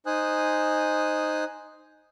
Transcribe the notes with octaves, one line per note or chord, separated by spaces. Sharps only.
D#4 C5 G#5 D#6 F#6